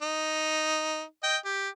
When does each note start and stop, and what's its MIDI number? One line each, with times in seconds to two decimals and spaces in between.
0.02 1.02 63
1.23 1.37 75
1.23 1.37 79
1.45 1.69 67